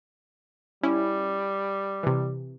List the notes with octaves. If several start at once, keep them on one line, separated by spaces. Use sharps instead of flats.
G3 C#4 E4
C3 E3